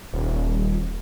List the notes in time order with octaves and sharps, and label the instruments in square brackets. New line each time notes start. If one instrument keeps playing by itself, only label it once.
[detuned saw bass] D#1